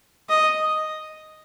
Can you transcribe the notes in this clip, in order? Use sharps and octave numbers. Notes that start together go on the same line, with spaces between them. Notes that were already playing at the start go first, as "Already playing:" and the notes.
D#5